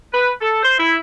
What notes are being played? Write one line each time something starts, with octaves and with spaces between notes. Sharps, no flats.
B4
A4
C5
E4